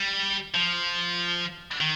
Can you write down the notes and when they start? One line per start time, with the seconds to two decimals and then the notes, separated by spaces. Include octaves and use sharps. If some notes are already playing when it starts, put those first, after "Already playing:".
Already playing: G3
0.54 F3
1.81 D#3